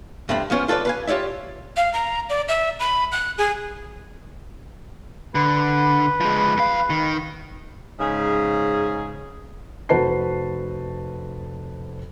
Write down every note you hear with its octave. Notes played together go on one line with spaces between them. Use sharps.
G2 A3 C4 B5
F3 B3 C#4 F4
F4 A4 B4 C5 D5
B4 F5 G#5
F4 G4 C#5 D5 E5
F5
A#5
D5
E5
B5
F#6
G#4
D3 B4
F3 G#3
F2 F5
D#3
G#2 C#3 G#4
F1 F#4 B4 C5 A5 C7